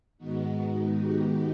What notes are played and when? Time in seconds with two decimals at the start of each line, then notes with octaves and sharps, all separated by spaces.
0.18 G#2 D#3 G#3 B3 D#4 F#4
0.97 G4